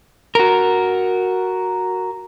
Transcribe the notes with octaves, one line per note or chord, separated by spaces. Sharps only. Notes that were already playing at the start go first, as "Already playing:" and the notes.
F#4 A#4